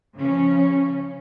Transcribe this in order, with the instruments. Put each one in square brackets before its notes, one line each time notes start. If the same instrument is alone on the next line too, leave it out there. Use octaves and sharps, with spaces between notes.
[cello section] C#3 F3 C#4